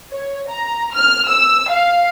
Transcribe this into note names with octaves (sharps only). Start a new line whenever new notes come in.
C#5
A#5
F6
E6
F5